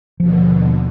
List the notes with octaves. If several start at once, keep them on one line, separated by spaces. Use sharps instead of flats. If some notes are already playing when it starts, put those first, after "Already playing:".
D#2 B2 D3 F3